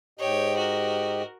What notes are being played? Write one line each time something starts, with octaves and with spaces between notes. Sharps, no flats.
G#2 G4 C#5 D#5 G5
F#4 A#4